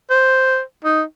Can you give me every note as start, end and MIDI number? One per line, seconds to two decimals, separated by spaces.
0.10 0.61 72
0.85 1.03 63